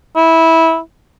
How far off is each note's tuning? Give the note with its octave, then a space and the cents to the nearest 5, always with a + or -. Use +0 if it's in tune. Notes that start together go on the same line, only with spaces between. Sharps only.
E4 -15